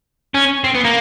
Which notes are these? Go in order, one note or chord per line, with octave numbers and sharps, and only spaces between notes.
C#4
C4
B3
A#3